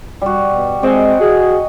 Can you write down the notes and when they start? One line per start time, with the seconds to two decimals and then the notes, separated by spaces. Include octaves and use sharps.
0.22 G3 F#4
0.54 B2
0.83 G#3 C4 D#5 F#5 G#5
1.20 F#4 G#4